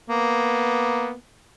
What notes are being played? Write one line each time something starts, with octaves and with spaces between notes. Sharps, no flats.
A#3 B3